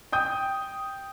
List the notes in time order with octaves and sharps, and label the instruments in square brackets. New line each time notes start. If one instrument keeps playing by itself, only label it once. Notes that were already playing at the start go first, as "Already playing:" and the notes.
[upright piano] G5 D#6 G6